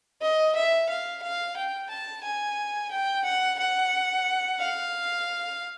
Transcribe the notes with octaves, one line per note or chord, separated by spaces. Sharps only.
D#5
E5
F5
F5
G5
A5
G#5
G5
F#5
F#5
F5